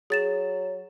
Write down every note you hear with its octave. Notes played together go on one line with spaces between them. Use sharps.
F#3 G#4 A6 E7